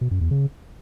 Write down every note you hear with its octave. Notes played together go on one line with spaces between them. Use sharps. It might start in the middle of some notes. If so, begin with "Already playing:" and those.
B2
F#2
E2
C#3